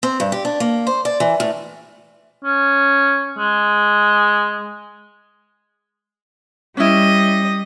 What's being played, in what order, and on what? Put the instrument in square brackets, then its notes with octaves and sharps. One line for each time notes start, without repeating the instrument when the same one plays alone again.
[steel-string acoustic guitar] C4
G2
G4
D4
A#3
C5
D5
E3
A2
[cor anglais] C#4
G#3
[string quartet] G3 D#5 [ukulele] C#4 E4